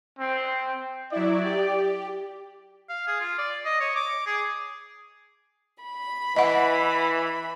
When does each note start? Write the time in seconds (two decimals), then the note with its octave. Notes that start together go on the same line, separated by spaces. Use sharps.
0.19 C4
1.12 F#3 E4 D5
1.43 G4
2.89 F5
3.07 G#4
3.20 F4
3.38 D5
3.65 D#5
3.80 C#5
3.96 D6
4.27 G#4
5.83 B5
6.36 E3 D#5 F#5